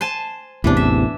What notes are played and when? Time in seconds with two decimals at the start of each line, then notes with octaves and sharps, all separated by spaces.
0.01 C5 G#5 A5
0.64 A1 E2 C3 E3 D4
0.77 E5